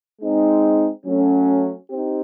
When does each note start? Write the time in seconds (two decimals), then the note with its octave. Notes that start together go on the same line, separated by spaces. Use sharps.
0.21 G#3 C4 D#4
1.05 F#3 A3 C#4
1.90 C4 D#4 G4